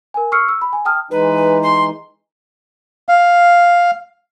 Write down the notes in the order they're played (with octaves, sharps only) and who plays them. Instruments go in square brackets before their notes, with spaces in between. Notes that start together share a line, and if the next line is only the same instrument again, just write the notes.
[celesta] A#4 G#5
C#6 E6 F6 C7 C#7
E6
B5
G#5
G5 A5 D#6 F6
[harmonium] E3 G#3 D#4 [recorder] B4
[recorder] C6
[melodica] F5